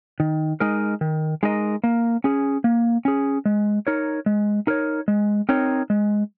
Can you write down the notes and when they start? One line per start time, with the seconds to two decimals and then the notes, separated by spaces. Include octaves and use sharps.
0.20 D#3
0.60 G#3 D#4 A#4 D#5
1.01 D#3
1.43 G#3 D#4 A#4 D#5
1.84 A#3
2.24 C#4 G#4
2.64 A#3
3.05 C#4 G#4
3.45 G#3
3.87 D#4 A#4 C#5
4.26 G#3
4.67 D#4 A#4 C#5
5.08 G#3
5.49 C4 D#4 A#4 C#5
5.90 G#3